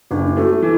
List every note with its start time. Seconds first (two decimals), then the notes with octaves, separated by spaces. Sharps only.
0.11 F#1 D4
0.27 E4
0.36 A3 F#4
0.50 A4
0.62 E3